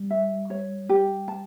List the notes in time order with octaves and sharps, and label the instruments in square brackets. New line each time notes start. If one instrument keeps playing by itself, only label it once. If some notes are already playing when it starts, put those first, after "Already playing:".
Already playing: [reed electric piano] G3
[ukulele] E5
C#5
G4
A5